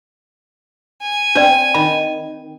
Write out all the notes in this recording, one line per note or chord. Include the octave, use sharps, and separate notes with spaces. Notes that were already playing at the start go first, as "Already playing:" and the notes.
G#5
C4 D4 B4 D5
D#3 B5